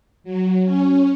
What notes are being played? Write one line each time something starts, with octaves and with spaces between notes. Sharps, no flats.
F#3
C#4